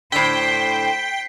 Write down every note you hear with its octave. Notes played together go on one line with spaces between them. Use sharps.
A2 D3 C5 G5 B6 C7